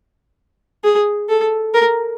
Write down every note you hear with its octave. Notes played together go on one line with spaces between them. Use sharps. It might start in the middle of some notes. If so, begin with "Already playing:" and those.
G#4
A4
A#4